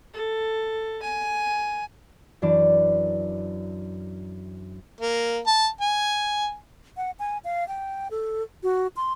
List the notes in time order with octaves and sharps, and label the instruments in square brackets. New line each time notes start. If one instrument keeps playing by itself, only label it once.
[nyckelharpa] A4
G#5
[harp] F#2 E3 D4 D5
[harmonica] A#3
A5
G#5
[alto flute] F#5
G#5
F5
G5
A4
F#4
C6